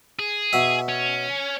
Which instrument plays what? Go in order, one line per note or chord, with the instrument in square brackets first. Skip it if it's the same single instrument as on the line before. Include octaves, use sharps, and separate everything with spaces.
[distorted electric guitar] G#4
[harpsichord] B2 E5
[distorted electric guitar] C#4